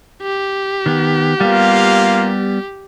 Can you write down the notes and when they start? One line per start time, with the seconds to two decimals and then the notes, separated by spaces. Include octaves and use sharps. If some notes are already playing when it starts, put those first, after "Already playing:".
0.23 G4
0.86 D#3 B3
1.41 G3 A#3 B3 F4 F5